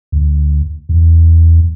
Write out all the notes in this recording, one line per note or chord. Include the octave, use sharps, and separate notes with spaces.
D2
E2